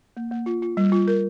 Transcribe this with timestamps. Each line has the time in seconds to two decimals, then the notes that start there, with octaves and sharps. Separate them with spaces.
0.17 A#3
0.31 A#3
0.46 F4
0.62 F4
0.77 G3
0.92 F4
1.07 A#4